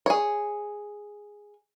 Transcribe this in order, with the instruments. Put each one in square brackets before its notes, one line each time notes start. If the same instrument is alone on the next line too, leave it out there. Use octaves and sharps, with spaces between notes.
[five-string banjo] G#4 C#5